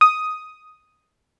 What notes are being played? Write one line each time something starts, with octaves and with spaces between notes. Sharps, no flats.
D#6